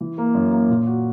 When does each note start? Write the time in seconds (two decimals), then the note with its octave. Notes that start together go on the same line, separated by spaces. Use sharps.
0.01 E3
0.18 A#3
0.35 F#2
0.52 A#3
0.69 A#2
0.87 F#4